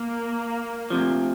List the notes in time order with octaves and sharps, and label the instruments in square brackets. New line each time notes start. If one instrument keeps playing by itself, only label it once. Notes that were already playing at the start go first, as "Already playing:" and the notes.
Already playing: [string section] A#3
[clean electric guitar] D2 C3 F3